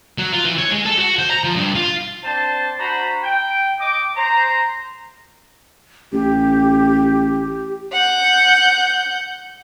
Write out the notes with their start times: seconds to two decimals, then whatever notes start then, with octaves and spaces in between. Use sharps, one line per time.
0.18 F#3
0.33 F4
0.45 E3
0.58 C#5
0.71 G#3
0.85 A4
0.99 F#4
1.19 C5
1.31 A#5
1.44 F3
1.56 G2
1.75 F4
2.24 C4 D4 C5 A5
2.78 D4 F#4 C5 A#5 B5
3.23 G5
3.79 D#5 G5 D6
4.17 C5 A#5
6.12 A1 G4
7.93 F#5 G6